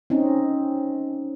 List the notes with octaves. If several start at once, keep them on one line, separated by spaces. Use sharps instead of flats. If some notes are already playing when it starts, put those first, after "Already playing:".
C4 C#4 D#4